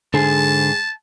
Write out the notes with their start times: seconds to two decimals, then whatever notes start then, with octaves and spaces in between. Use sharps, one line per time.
0.14 G#2 D3 G#4 A5